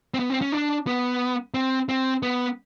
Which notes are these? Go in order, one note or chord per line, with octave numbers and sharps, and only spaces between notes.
C4
B3
C4
C#4
D4
B3
C4
C4
B3